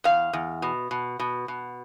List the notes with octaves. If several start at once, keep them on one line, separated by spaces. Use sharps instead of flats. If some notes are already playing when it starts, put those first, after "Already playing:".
E2 F5
E2
B2
B2
B2
B2